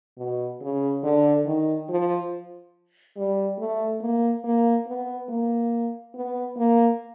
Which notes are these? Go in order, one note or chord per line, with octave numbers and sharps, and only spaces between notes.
B2
C#3
D3
D#3
F3
G3
A3
A#3
A#3
B3
A#3
B3
A#3